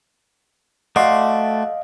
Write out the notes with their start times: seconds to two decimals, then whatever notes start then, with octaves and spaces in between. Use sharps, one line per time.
0.96 A3 F#4 D5 D#5 F5 C6